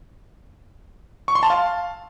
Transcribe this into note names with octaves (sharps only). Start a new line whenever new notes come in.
C#6
C6
A5
F5